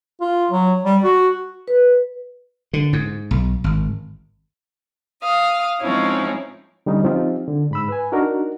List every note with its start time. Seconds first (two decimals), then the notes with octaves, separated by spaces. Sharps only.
0.21 F4
0.51 F#3
0.85 G3
1.03 F#4
1.68 B4
2.73 D3
2.93 G#2
3.31 B1
3.64 G#1
5.22 F5 D#6
5.80 F3 G#3 C4 C#4 D#4 E4
6.86 D3 G3 C#4 D#4
7.04 F3 C4 D#4 F4 G4
7.48 D3
7.71 G#2 B5 E6
7.88 B4 G#5
8.12 D4 D#4 F#4 A#4